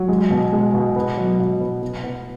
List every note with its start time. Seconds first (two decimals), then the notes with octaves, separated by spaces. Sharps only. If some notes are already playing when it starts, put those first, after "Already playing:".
Already playing: F#3
0.08 G#3
0.30 B2
0.53 G#3
0.74 B2
0.96 B3
1.17 F#3
1.39 B2
1.61 B3
1.82 B3
2.04 B3